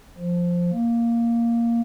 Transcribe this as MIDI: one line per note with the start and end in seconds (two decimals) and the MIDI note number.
0.18 0.71 53
0.72 1.81 58